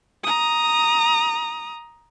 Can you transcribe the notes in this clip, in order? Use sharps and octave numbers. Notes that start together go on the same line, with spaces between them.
A#5 D#6